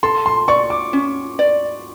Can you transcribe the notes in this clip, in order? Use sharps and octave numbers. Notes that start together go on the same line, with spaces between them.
A4 C6
C6
D5 C#6
D6
C#4
D5